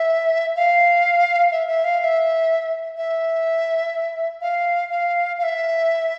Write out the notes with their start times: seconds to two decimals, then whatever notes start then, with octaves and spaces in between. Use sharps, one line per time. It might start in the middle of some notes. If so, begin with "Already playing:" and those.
Already playing: E5
0.56 F5
1.52 E5
1.68 E5
1.84 F5
2.00 F5
2.04 E5
2.97 E5
4.41 F5
4.89 F5
5.38 F5
5.43 E5